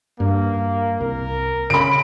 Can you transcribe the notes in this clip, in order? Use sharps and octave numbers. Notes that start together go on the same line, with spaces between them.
G2 A#3
C2 A#4
C#3 B5 D7